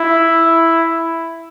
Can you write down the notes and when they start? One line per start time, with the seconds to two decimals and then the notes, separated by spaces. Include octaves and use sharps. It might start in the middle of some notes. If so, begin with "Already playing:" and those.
Already playing: E4